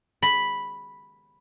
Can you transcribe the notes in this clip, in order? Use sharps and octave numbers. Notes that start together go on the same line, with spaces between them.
B5